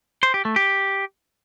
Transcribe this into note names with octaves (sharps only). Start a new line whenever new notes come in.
C5
G4
A3
G4